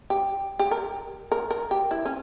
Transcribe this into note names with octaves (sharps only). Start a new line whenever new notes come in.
G4
G4
A#4
A#4
A#4
G4
E4
C#4